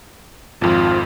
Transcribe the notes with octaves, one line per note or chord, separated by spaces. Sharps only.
G#1 F2 F4